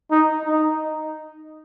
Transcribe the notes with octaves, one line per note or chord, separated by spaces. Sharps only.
D#4
D#4